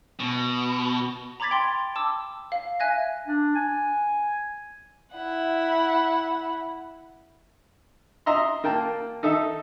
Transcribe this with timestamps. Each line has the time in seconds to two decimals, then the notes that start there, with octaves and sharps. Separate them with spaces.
0.20 B2
1.40 A#5 B5 D6 G#6 A6 B6
1.51 G5 C6
1.95 A5 D6 E6
2.52 F5
2.80 E5 G#5 F#6 G#6 A#6
3.27 D4
3.55 G#5
5.12 E4 F#5
8.26 D#5 E5 A#5 C6
8.64 A#3 G5 A5
9.23 D#4 A4 E5